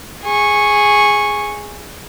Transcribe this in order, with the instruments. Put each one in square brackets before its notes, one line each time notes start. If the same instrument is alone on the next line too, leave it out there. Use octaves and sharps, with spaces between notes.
[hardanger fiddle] G#4 C#6